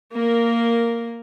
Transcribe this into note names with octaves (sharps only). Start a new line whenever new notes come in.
A#3 A#4